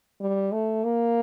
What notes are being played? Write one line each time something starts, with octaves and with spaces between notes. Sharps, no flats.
G3
A3
A#3